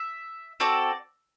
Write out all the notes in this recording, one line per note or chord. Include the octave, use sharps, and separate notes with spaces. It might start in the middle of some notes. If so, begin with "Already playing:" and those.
Already playing: E5
C4 F#4 A4 D5